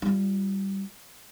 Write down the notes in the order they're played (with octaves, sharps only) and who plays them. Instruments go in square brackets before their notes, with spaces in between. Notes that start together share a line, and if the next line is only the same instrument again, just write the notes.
[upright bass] G3 F4